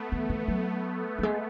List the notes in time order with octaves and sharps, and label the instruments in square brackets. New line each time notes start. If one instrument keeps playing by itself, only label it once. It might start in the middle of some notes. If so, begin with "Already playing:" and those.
Already playing: [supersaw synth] A3 B3
[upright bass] E3
E3
F#3
F#3
G#3